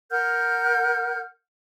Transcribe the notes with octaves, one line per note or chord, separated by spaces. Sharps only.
A#4 F#5 F6 G6